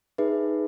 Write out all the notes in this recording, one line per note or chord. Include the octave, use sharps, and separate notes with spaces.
D#4 G#4 B4 E5